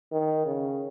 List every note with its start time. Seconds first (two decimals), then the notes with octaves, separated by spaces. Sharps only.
0.12 D#3
0.46 C#3